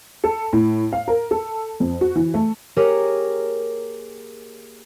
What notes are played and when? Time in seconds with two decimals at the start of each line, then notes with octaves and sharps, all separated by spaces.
0.24 A4
0.53 A2
0.93 F5
1.08 A#4
1.31 A4
1.80 F2
2.01 F#4
2.15 E3
2.34 A3
2.76 A#3 G4 G#4 A#4 C#5